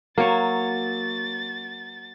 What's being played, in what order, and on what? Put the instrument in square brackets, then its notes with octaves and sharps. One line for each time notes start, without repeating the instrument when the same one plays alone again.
[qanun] F#3 C#5 [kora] A#3 [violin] A6